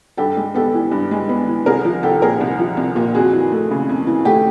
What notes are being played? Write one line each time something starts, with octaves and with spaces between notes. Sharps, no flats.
G2 G4 A4
G#3
B3 G4 A4
E3
G2
G#3
B3
E3
C2 G#4 A#4
F3
C2 G4 A4
A#2 G#4 A#4
C2
F3
C2
A#2
F2 F#4 G#4
E3
A3
C#3
F2
E3
A3 G4